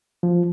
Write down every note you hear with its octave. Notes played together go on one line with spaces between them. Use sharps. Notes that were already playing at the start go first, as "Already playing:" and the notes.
F3